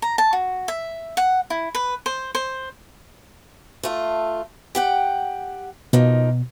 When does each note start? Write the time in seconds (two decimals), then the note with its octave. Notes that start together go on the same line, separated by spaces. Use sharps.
0.02 A#5
0.18 A5
0.33 F#4
0.68 E5
1.17 F#5
1.50 E4
1.75 B4
2.06 C5
2.35 C5
3.83 A3 F4
4.75 G4 F#5 G5
5.93 B2 F3 A#3 D#4